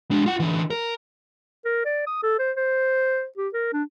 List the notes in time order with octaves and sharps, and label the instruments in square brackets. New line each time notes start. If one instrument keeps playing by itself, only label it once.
[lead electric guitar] G#3 D4
F4 F#5
D3 E3
A#4
[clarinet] A#4
D5
D#6
A4
C5
C5
G4
A#4
D4